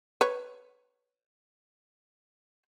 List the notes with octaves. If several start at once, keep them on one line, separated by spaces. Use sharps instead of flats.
B4 C#5